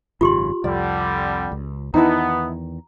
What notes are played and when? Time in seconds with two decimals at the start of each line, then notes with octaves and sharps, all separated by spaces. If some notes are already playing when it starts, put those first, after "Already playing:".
0.21 G#1 F#2 C#3 F4 G4 C6
0.64 C2 F2 D3 G3 D5
1.52 C#2
1.94 E2 D#3 B3 D#4 E4 A5 A#5